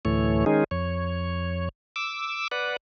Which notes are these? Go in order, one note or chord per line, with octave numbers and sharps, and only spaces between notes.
D2 A2 E3 A3 C#5
D#3 G#3 C#4 D#4 G#4
F2 C#5
D6 E6
B4 D5 F#5